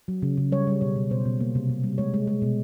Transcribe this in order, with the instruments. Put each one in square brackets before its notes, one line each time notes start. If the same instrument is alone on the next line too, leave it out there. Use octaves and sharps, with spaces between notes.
[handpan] F#3
C#3
C#3
G3 C#5
G3
B2 C#5
B2
B2 C5
B2
A#3
C3
C3
G3
G#3 C#5
G#3
G#3
B2